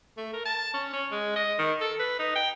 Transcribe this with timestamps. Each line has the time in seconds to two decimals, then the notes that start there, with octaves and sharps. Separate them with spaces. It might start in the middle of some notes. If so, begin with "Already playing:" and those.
0.17 A3
0.33 A#4
0.46 A5
0.74 C#4
0.93 C#4
1.11 G#3
1.36 D#5
1.59 D#3
1.81 A4
1.99 B4
2.19 D#4
2.35 G5